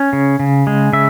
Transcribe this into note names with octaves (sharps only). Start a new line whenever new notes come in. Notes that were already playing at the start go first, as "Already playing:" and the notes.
Already playing: C#4
C#3
C#3
G#3
C#3 E5